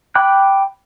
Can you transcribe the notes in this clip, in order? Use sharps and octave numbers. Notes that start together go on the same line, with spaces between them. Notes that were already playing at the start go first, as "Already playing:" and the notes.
G5 B5 D6 F#6